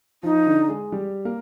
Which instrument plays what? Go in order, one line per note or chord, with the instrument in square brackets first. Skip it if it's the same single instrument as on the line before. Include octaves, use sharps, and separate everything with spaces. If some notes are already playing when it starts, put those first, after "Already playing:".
[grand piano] F3 F4 [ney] D#4
[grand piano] D3 D4
G#3 G#4
G3 G4
A#3 A#4